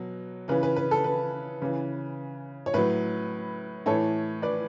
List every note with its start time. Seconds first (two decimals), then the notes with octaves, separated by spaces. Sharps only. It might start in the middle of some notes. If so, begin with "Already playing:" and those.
Already playing: B2 F#3
0.48 C#3 E3 B4
0.63 B4
0.76 B4
0.91 A4
1.04 B4
1.62 C#3 E3
2.66 C#5
2.74 A2 F#3 B4
3.86 A2 E3 A4 C#5
4.42 B4 D5